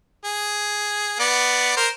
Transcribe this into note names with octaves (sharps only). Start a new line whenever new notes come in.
G#4
B3 D5
A#4 C5